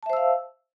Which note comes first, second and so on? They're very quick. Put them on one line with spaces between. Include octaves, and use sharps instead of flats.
A5 E5 C5 E6 F5